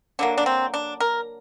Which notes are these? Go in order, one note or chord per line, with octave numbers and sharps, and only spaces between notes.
D3 F#3 A#3 D4
D4
C4
D4
A#4